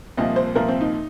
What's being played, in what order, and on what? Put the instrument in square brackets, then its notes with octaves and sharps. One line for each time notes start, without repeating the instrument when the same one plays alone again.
[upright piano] C2 A#2 F3 D#5
C5
C2 A#2 F3 A#4
C4
D#4